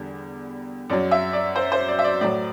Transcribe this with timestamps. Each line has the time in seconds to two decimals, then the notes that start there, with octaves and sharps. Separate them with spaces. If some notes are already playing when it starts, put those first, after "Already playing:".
Already playing: E2 D3 G3
0.89 F#2 F#3 D5
1.11 E5
1.33 D5
1.55 C5
1.72 C5
1.88 D5
1.99 E5
2.04 D5
2.21 A2 F#3 D5